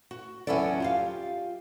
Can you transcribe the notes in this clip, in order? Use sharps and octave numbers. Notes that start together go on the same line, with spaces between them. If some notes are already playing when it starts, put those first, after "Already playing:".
F#4
E2 F#3 C#4 E4 A4 D5
F4 G4 F5